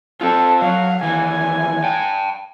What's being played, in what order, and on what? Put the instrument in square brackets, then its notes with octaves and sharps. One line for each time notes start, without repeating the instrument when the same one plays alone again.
[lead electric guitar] C4 F4 [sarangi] A4
[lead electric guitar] F#3 [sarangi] F5
[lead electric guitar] D#2 E3 [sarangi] G#5
[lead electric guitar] G5 A5